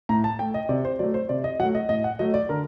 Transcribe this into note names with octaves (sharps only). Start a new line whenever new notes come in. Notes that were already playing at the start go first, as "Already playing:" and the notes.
A2 A#5
A5
A3 G5
D#5
C3 D5
C5
F#3 A3 D5
C5
C3 D5
D#5
F#3 A3 F#5
D#5
A2 D#5
F#5
F#3 A3 D#5
D5
D3 A#4